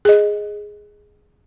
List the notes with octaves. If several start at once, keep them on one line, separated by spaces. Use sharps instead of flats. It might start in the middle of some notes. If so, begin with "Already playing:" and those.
G#4 D#5